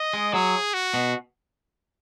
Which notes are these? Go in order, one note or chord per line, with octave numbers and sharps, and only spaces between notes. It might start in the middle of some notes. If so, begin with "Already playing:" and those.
Already playing: D#5
G#3
F#3 G#4
F#4
B2